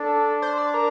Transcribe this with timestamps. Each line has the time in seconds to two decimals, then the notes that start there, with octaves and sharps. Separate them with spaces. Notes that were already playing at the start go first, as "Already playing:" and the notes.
Already playing: D4 A4
0.42 C5
0.58 D5
0.74 A#4